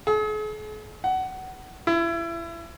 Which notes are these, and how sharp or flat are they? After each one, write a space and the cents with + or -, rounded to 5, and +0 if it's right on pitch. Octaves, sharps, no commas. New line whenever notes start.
G#4 +45
F#5 +20
E4 +30